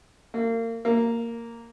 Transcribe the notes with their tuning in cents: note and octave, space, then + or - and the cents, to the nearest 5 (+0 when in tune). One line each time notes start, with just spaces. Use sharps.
A#3 -35
A#3 -10